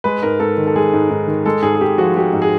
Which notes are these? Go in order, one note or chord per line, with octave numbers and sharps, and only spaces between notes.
G#3 B4
G#2 A#4
G#2 A4
D#3
A4
G#3 G#4
G#2
G#2
D#3
G#3 A4
G#2 G#4
G#4
G#2 G4
F3 F#4
G#3 G4
G#2
G#4